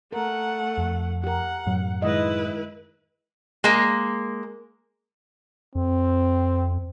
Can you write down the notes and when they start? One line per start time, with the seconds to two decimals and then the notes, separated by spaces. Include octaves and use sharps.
0.13 A3 A#4 F#5
0.78 F2
1.24 G4 A#4 F#5
1.66 F#2 A2 F#3
2.02 D#3 G#3 E4 B4 D#5
3.64 G#3 A#3
5.75 F2 C4